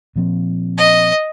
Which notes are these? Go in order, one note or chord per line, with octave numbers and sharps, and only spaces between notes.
A#2 F3 C4
D#5